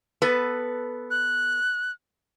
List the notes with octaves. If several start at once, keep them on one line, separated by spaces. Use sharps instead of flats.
B3 A4 B4
F#6